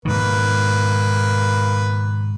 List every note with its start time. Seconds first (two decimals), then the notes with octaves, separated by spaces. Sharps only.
0.05 G#2 B2 D#3 A#3 B4